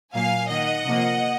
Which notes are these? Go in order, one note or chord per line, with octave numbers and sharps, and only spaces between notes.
A#2 F#3 A#3 F5 G#5
D#3 A#3 D#5 F#5
C3 F3 A#3